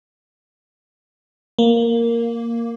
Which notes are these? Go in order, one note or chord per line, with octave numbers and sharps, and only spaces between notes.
A#3